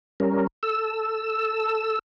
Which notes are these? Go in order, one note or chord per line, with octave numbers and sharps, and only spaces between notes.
G3 C#4 A#4
A4 E6